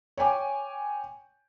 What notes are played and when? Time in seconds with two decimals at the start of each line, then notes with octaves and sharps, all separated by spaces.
0.17 C#5 G5 G#5 D6